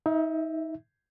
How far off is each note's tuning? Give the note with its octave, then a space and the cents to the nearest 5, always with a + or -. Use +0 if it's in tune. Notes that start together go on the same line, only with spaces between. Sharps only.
D#4 +30 E5 +0